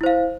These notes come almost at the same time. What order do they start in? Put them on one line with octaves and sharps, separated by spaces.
E4 C5 F5